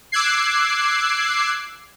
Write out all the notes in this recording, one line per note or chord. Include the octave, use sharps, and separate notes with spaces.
D6 E6 F#6 G#6 C7